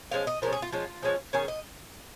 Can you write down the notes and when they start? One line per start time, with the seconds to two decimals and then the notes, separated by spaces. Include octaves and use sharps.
0.11 F3 G#3 C#4 F5
0.27 D#5
0.42 F3 G#3 C#4 A#4
0.53 G#4
0.62 F4
0.72 F3 G#3 C#4 F4
1.02 F3 G#3 C#4
1.33 D#3 C#4 G#4
1.48 D#5